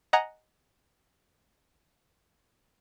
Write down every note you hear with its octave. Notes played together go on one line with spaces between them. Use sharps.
D#5 F#5 G#5 A#5